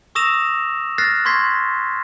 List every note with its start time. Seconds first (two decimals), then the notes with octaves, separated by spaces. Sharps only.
0.15 C#6 D#6 E6 A#6 E7 F7
0.98 F6 F#6 A6 A#6 C7
1.25 C6 C#6 G#6 B6 C7